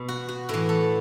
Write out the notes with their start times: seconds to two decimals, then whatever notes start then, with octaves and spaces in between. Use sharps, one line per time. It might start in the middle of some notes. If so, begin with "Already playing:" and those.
Already playing: B2
0.08 F#4
0.29 F#4
0.49 A2 E3 E4
0.69 A4